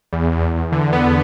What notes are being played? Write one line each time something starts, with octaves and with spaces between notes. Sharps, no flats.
E2
E2
E2
D3
B3